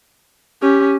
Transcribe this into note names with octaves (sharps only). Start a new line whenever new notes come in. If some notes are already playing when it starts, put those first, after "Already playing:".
C#4 G4